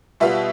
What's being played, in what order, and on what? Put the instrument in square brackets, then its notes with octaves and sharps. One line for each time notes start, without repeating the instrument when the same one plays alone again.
[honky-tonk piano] B2 G3 B3 F4 E5